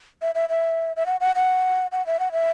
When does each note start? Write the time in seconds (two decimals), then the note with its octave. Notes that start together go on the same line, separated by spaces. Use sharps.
0.22 E5
0.35 E5
0.49 E5
0.96 E5
1.06 F#5
1.21 F#5
1.35 F#5
1.92 F#5
2.07 E5
2.19 F#5
2.32 E5